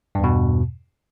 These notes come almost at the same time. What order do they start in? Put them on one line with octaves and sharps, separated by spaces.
G2 E2 B2